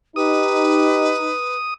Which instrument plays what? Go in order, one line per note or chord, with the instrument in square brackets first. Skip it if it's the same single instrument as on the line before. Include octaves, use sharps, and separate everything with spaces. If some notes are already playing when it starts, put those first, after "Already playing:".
[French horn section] D#4 [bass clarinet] G4 [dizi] B4 [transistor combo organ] D#6